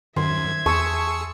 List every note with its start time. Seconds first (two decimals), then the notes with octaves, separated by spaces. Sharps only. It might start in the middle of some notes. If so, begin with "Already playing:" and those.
0.16 F#2 D#3 C5 E5 G#6
0.66 E2 G#4 A5 C#6 E6 C#7